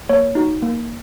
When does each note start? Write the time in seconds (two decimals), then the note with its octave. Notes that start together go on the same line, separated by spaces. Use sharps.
0.09 A#3 C#5
0.35 D#4 F#4
0.62 A#3